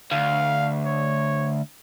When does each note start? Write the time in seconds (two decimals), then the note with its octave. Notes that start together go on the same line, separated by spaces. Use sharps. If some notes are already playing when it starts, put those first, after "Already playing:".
0.12 D2 F5
0.85 C#5